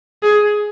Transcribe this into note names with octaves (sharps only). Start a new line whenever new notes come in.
G#4